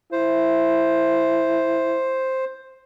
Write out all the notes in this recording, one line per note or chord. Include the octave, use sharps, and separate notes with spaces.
E4 C5